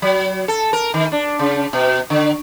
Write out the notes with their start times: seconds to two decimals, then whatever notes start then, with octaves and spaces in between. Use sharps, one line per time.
0.02 F#3
0.48 A4
0.73 A#4
0.94 D#3
1.12 D4
1.39 C#3
1.73 B2
2.10 D3